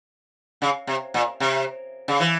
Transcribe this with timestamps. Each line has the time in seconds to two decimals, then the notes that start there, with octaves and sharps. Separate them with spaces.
0.62 C#3
0.87 C3
1.14 A#2
1.40 C3
2.08 C#3
2.20 E3